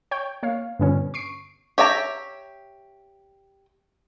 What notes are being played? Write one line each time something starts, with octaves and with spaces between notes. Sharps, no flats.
C#5 G5 G6
A#3 C#5 F5
G2 A#2 D3 G3 B3 C#4
C#6 C7 D7
G4 C#5 E5 G5 A#5